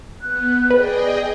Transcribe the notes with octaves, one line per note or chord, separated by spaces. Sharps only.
B3 F#6
G#4 B4 D5 D#5 G5